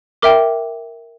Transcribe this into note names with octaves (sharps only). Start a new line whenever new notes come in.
A#4 E5 G5 D6